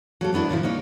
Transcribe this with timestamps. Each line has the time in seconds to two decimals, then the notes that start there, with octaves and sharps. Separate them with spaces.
0.21 F#3 A#3 A4
0.33 F#3 B3 D4 E4 A#4
0.49 A2 D3 F3 E4
0.63 A#3 D#4 C#5